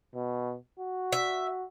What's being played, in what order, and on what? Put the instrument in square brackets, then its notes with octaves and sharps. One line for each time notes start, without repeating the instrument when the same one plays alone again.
[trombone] B2
F#4
[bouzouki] E5